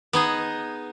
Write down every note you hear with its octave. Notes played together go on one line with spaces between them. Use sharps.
B3 D#4 G#4